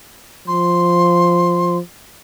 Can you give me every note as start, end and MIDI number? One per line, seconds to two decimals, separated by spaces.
0.48 1.80 53
0.48 1.77 84